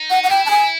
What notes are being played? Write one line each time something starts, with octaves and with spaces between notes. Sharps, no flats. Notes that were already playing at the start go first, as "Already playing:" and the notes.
Already playing: D#4
F#5
F#5
E4 G5
A5
G#5